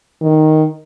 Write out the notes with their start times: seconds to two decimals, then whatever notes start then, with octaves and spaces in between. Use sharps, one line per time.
0.22 D#3